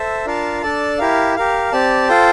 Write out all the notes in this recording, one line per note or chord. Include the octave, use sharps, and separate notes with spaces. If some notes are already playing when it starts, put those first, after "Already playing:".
Already playing: A4 C5 E5
D4 F4 A#4 F5 A5
D4 A4 D5 A5
E4 G4 A#4 F5
G4 A#4 F5
C4 G4 D5 A5
F4 A4 C5 G5